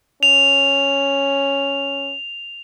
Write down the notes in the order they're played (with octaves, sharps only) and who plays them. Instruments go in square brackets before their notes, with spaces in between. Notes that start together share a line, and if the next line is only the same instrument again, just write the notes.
[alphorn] C#4 [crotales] F7